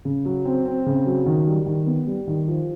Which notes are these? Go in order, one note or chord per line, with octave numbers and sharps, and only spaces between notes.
C#3
F#3
C4
C4
C#3
F#3
D#3
G3
D#3
B3
G3
D#3
F3